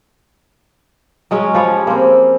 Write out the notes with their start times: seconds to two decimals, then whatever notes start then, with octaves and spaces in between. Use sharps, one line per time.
1.31 F#3 G#3 C#4
1.55 F3 G4 C#5 D#5 B5
1.87 A#3 C4 G#4